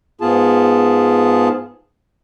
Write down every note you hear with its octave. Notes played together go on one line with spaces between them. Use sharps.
G#2 B3 F4 G#4 A5